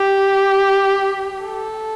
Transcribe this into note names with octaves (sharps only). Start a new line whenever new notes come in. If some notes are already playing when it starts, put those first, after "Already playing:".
Already playing: G4
A4